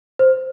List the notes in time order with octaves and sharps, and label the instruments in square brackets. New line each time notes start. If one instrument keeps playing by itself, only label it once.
[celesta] C5